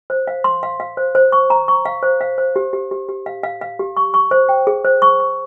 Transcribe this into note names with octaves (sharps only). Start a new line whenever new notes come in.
C5
F5
C6
F5
F5
C5
C5
C#6
A#5
C#6
F5
C5
F5
C5
G4
G4
G4
G4
F5
F5
F5
G4
C#6
C#6
C5
G5
G#4
C5
C#6
C#6